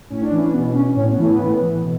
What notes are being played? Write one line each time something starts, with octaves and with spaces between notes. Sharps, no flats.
A2 C#4
D4
E3 C#4
B2 B3
C#4
A2 C#4
B3
E3 A3
B3
A2
E3
B2